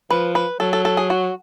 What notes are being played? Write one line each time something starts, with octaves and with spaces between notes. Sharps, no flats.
F3 B4
B4
F#3 A4
A4
A4
G#4
F#4